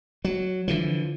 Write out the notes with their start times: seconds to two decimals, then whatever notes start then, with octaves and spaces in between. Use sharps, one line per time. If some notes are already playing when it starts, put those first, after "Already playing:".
0.25 F#3
0.68 D3 E3 F3